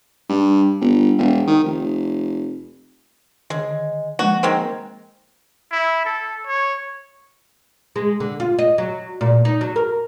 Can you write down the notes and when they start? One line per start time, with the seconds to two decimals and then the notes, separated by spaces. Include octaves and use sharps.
0.29 G2
0.81 G1
1.18 E1
1.47 D#3
1.64 F1
3.50 D3 D#3 G#3
4.19 F3 G#3 A#3 F#4
4.43 D#3 G#3 C4 F6 A#6
5.72 E4
6.05 A4
6.47 C#5
7.96 G#3
8.20 D3
8.40 F4
8.59 D#5
8.78 F#3
9.21 A#2
9.45 D#4
9.61 F#3
9.76 A#4